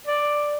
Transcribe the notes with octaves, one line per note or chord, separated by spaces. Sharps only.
D5